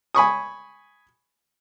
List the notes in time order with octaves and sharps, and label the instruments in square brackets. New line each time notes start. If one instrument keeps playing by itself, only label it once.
[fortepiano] G#5 B5 C#6 D#6